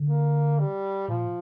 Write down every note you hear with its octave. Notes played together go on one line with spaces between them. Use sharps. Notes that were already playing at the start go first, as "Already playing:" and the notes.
Already playing: D3
A#3
G3
A#2 F3